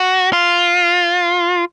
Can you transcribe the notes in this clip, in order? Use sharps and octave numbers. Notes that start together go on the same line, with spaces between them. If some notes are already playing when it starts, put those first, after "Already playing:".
Already playing: F#4
F4